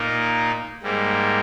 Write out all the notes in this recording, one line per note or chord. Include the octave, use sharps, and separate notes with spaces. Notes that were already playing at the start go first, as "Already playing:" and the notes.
Already playing: A#2 A#3 D#4
G#2 G3 A#3